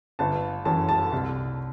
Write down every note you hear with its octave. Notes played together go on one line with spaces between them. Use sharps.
G1 A5
F#2 E3 A5
A5
C2